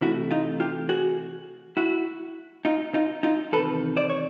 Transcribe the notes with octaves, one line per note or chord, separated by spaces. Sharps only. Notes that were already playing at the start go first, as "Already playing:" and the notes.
C3 E3 A3 E4 F#4
D#4 F4
F4 G4
F#4 G#4
E4 F#4
D#4 F4
D#4 F4
D#4 F4
E2 C3 D#3 A4 B4
C5 D5
C#5